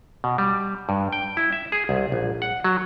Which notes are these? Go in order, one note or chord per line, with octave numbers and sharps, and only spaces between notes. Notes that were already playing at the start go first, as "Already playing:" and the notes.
B2
G3
G2
G5
E4
E5
G#4
C2
A#1
F#5
F#3